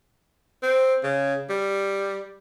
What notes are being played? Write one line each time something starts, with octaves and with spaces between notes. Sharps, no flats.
C4
C#3
G3